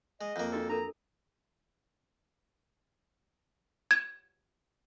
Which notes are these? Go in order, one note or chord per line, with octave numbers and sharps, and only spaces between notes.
G#3 D#5
F2 A#3
D4 F#4 A4 D#5
D4 A4 A#4 A#5
G#6